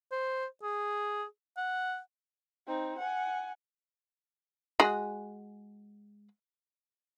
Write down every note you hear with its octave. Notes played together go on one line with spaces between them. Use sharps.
C5
G#4
F#5
C4 D#4
F#5 G#5
G#3 F#4 G#4